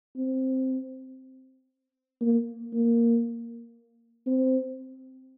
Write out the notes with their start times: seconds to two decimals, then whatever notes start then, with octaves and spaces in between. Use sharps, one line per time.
0.16 C4
2.21 A#3
2.73 A#3
4.26 C4